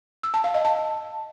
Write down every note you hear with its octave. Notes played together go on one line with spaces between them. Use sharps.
E6
A5
F5
D#5
A5